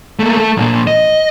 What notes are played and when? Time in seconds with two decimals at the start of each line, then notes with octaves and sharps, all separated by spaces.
0.20 A3 A#3
0.37 A3 A4
0.58 A#2 F3
0.87 D#5